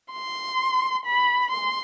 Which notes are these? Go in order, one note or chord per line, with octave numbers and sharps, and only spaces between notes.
C6
B5
C6